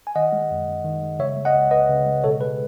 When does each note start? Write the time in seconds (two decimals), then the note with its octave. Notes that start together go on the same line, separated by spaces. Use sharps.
0.07 G#5
0.15 D#3 D#5 F#5
0.33 G#3
0.51 F#2
0.68 F#2
0.84 D#3
1.02 G#3
1.19 C#3 C#5 E5
1.36 G#3
1.45 D#5 F#5
1.54 C#2
1.71 C#2 B4 D#5
1.89 C#3
2.06 G#3
2.24 B2 A4 C#5
2.41 G#3 B4